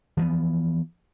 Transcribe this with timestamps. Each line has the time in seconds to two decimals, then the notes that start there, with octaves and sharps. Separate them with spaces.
0.17 E3 F3 B3